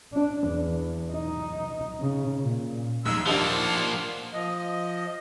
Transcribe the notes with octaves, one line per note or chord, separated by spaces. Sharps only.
D4
E2
D#4
C#3
A#2
A#1 D#2 G#3 E6
F3 A#3 D4 D#4 G4 C5 F#5 A5
F3 D#5